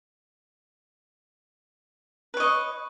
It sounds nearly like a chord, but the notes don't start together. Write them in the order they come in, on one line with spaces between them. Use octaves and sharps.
B4 C#5 D#5 C#6